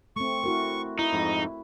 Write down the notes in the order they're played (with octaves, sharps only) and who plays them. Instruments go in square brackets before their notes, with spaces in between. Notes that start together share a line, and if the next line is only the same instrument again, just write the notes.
[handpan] A3 C4 [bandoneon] C#6
[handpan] E4 F#4 A#4
[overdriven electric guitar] D#4 [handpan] E4
[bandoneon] F2 G#2